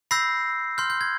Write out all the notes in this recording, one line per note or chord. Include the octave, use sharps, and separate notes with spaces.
B5 E6 G6 A#6 C7
C6 F6 G6
G6
G#6